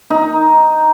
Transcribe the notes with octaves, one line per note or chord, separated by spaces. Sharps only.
D#4